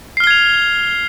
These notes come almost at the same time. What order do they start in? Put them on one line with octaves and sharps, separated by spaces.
C7 F6 G7 G#6 F7